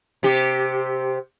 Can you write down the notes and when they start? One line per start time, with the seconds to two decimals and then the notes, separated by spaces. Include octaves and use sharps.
0.23 C3 G4